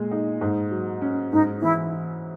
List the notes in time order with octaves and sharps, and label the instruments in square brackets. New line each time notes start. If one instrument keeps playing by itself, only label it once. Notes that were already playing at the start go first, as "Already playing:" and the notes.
Already playing: [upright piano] A#2 G#3
D#4
G#2
F#3
C#4
[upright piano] G#2 [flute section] D#4
[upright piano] E3 [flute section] E4